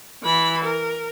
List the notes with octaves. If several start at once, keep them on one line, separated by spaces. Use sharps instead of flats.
E3 B5
A#4